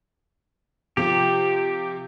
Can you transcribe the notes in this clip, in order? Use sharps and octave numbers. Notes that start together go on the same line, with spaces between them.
C3 F3 G4